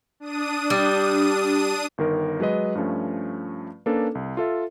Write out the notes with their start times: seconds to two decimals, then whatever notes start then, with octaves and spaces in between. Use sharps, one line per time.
0.20 D4 D#6 D#7
0.70 G3
1.98 G1 D#3 A#4
2.40 F#3 G#3 B4 D#5
2.75 G2 F3 A3 C#4
3.86 A#3 C#4 D4 A4 B4
4.15 C2
4.37 F4 A4 E5